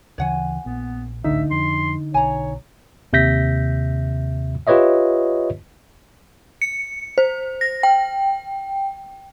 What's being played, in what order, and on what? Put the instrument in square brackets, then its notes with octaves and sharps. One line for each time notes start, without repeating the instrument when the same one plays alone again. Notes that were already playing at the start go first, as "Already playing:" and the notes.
[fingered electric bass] D2 C#3 E3 [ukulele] C#5 F#5 G#5
[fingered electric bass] A#1 [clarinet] B3
[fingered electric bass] G#1 C#2 A2 [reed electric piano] D3 D#4 [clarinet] E5
[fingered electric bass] F2 [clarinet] C6
[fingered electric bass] B1 [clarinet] C#5 [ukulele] G#5 A#5
[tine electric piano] D#2 C3 E5 G6 A#6 B6
F4 G4 B4 C#5 D#5 E5
[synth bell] C#7
C5
A#6
G5